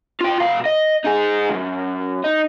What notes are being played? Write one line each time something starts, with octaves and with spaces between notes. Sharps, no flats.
F4 G5
B2 F5
D#5
D#4 G#4
C#2 F#2
D#4